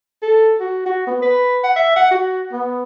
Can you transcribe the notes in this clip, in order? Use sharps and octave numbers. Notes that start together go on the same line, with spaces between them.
A4
F#4
F#4
B3
B4
F#5
E5
F#5
F#4
B3